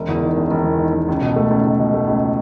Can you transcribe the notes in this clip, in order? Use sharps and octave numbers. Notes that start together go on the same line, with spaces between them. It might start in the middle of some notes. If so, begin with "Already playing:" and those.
Already playing: E1
E2
D#3
E1
E1
E2
D#3
E1
C#2
B2
A3
C#2
C#2
B2
A3
C#2